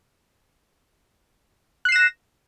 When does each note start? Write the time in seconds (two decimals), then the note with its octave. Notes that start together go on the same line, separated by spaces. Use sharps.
1.85 F#6
1.89 C7
1.92 E7
1.96 A#6